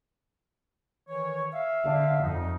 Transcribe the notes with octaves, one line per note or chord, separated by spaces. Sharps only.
D#3 E3 C#5
E5 F5
D3
F2 D#4